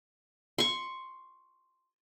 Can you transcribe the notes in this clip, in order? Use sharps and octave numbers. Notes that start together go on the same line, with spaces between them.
C6 C#6